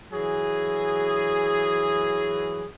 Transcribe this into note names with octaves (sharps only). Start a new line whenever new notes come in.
E3 F#3 G#4